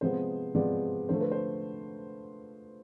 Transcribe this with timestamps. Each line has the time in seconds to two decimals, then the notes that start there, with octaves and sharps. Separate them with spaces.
0.01 C3 F3 G#3 B3 C5
0.55 C3 F3 G#3 B3 D5
1.09 D3 F3 A3 C5
1.21 B4
1.31 C5